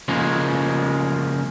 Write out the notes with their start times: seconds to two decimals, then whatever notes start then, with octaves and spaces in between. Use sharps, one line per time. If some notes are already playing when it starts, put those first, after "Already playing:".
0.08 C#3 F3 G#3 A#3